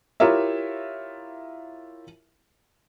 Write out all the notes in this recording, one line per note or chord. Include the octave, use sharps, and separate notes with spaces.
E4 F4 G4 A#4 C#5 E5